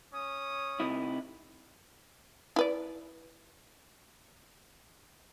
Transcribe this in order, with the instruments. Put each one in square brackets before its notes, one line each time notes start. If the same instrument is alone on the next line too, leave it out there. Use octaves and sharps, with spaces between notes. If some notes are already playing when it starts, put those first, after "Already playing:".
[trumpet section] C#4 C#5 D#6
[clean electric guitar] C3 D#4 E4
[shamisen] E4 B4 D5